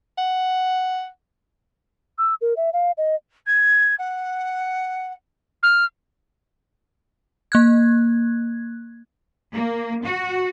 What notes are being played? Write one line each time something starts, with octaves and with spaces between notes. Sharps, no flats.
F#5
E6
A#4
E5
F5
D#5
G#6
F#5
F6
A#3 F#6 G#6
A#3
F#4